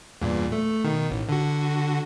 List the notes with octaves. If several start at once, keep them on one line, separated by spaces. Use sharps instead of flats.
E2 G2 A#2
A3
B2 D#3
A1
D3 F#4